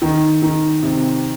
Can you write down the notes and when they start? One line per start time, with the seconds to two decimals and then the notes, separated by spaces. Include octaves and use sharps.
0.02 D#3
0.42 D#3
0.83 C3